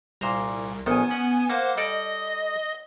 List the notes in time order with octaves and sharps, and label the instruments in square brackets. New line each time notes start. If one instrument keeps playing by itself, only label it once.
[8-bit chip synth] C2 [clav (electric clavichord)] A#2 C5 A#5
[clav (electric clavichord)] A#1 D#3 A4 [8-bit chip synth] B3 G#5
[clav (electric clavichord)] C#4 F#5
[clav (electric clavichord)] A#3 [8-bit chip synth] C5 F5 F#5
[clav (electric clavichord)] G3 A4 D5 [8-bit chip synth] D#5